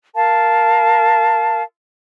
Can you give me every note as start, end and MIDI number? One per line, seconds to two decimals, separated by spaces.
0.15 1.62 70
0.15 1.62 77
0.15 1.62 81